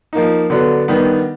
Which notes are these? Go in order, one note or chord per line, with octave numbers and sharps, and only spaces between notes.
F3 A#3 D#4
D3 F#3 B3 D4
D#3 G3 B3 D4